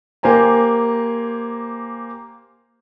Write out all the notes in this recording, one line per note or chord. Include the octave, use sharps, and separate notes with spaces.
A#3 G4 C5 G#5 A#5